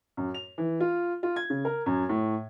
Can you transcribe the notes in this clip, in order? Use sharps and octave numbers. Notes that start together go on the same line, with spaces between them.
F#2
F7
E3
F4
F4
G#6
C#3
A#4
F#2
A2